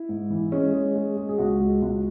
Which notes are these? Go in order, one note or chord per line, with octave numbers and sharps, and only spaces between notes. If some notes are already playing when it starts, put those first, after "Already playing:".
Already playing: E4
G#2
E3
G#3 C#4
G#3
G#3
G#3
G#4
C#2 F#4
G#3
C#2